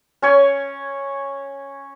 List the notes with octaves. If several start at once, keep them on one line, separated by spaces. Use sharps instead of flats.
C#4 C#5 G#5